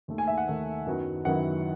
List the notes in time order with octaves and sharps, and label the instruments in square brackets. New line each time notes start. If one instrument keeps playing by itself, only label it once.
[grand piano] D#2 D#3 A3
G#5
E5
F#5
D#2 D#3 A3
F#2 D#3 F#3 B3 E4
F#2 D#3 F#3 B3 E4 F#5